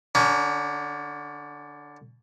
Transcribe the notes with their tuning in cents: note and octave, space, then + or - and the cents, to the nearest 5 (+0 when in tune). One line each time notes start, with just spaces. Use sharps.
D3 +0 C#4 +30 A#5 +0